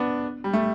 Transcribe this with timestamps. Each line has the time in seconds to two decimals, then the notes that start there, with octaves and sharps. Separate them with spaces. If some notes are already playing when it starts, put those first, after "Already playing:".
Already playing: B3 D4
0.44 G3
0.53 A3